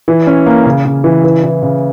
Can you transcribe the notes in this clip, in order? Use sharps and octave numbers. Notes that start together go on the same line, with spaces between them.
E3
C#4
A#3
C#3
C#3
E3
E3
E3
C#3